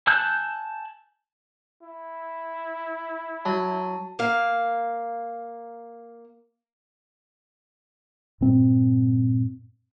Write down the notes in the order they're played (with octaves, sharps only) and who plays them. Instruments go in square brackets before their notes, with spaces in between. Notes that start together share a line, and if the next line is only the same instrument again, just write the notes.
[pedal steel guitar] G#5 A5 E6 F#6 G6
[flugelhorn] E4
[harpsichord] F#3 [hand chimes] A5
[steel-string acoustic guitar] A#3 F5
[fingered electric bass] G2 A#2 C4